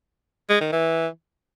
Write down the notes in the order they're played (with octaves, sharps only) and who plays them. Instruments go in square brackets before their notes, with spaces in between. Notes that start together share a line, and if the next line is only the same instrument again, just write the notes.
[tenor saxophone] G#3
D#3
E3